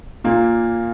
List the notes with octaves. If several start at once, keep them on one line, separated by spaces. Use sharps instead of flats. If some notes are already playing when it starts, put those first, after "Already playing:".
A#2 A#3